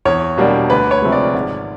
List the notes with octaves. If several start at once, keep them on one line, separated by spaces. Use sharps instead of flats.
E2 C#5
B2 G3 A#3 D4
D2 B4
C#5
C3 F3 G#3
D5
G#1